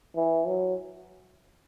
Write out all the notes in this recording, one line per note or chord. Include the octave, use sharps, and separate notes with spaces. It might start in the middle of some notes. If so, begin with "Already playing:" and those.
E3
F#3